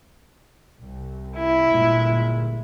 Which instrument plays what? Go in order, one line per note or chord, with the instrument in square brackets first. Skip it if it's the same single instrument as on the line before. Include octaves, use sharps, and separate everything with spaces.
[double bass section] C2
[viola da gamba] E4
[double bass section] G1 A#2 G#3